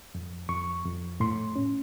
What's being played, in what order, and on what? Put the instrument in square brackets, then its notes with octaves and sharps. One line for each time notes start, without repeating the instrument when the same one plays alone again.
[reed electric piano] F2
F2 C#6
F2
A2 C6
C#4